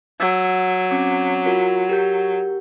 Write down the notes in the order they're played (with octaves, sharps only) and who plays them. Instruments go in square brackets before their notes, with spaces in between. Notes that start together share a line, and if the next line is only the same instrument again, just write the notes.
[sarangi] F#3 [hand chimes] E6
[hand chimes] C4 C#4 D6
F4 F#4 A#4
G4 A#4 G6